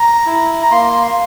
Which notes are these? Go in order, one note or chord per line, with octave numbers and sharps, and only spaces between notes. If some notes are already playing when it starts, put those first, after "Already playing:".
Already playing: A#5
E4
A#5
A#3 C6